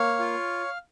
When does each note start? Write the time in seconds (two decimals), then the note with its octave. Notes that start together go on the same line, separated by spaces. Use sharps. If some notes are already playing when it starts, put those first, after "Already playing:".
Already playing: A#3 C#5 F5
0.19 F4